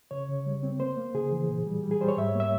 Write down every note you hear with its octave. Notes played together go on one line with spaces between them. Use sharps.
C#3 C#5
C#3
G3
C4
A#3 C5
A#3
C#3 G#4
E3
A#2
G3
G3
G#4
G3 C5
C#5
G#2 E5
C#5
A#3
E5